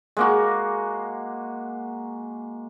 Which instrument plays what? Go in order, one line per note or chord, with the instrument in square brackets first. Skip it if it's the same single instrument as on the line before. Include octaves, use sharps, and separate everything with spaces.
[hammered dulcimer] G#3 A#3 F#4